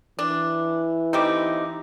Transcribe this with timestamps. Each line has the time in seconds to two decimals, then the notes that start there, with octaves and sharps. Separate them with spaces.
0.19 E3 D4
1.13 G3 A3 C4 D#4 G4 D6